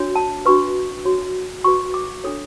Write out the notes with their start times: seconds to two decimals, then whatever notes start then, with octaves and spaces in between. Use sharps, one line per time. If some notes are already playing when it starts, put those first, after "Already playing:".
Already playing: D4 F#4 C#5
0.16 A5
0.46 D4 F#4 B4 C#6
1.05 F#4 C#5
1.64 F#4 B4 C#6
1.94 D6
2.24 D4 A4 C#5